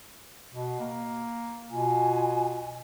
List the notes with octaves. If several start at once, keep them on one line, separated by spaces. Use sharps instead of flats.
B2
A#3
B2 F4 G#5